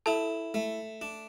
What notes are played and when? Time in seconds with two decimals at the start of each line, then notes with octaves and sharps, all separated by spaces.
0.06 E4 A4 A5
0.54 A3
1.02 D4